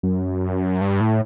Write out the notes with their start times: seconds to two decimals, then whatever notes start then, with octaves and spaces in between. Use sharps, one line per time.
0.03 F#2
0.81 G2
1.01 A2